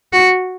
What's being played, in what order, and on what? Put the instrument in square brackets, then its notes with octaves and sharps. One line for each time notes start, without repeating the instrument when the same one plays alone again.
[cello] F#4